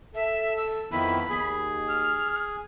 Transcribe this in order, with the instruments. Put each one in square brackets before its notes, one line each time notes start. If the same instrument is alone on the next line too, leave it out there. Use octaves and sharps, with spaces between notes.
[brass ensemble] A4 [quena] E5
[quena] E6
[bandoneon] F2 D#3 E4 [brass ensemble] B3 [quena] B5
[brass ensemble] D#2 [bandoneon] G#4
[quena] F6